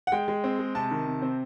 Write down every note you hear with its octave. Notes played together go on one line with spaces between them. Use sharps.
F#5
G#3 G5
G#3
C4
G#3
C3 A5
D#3
C3
C4